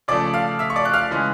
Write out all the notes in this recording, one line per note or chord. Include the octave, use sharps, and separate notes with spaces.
C#3 F3 A3 D5 D6
F5 F6
E5 E6
C#6
D5 D6
F#6
F5 F6
C#3 E3 G#3